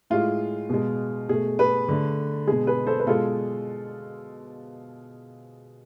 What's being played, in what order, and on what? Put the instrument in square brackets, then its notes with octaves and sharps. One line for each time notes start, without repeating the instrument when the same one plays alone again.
[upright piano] A2 G#3 F4
B2 G#3
B2 A3 G#4
G#4 B4
D3 A3
B2 G#3 G#4
G#4 B4
A4 C5
B4
B2 G#3 F4 A4